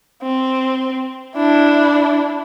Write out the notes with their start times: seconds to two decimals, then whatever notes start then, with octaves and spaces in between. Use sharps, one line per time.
0.23 C4
1.36 D4 E4